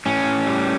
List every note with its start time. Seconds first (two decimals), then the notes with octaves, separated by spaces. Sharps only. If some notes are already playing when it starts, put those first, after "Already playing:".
0.06 A2 C#4
0.47 G3